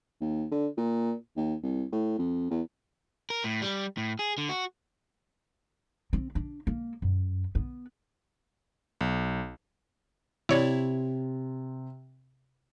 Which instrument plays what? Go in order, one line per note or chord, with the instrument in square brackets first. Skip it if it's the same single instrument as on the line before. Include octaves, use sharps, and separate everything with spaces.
[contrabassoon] D#2
D3
A#2
D#2
C2
A2
F2
E2
[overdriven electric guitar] A#4
A2
G3
A2
G#4
D3
F#4
[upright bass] C4
D4
A#3
F#2
B3
[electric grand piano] B1
[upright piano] C3 [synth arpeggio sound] E4 C#5 D5